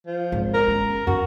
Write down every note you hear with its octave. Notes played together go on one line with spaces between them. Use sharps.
F3
G#1
A#4
C#4
F#2 F#4